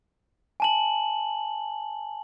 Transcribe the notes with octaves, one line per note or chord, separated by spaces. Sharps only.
G#5 A5 F#7